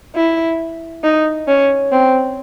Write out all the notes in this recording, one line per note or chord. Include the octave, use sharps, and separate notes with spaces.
E4
D#4
C#4
C4